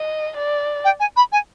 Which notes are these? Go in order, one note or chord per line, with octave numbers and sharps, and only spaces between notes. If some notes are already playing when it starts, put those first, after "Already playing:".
Already playing: D#5
D5
G5
G#5
B5
G#5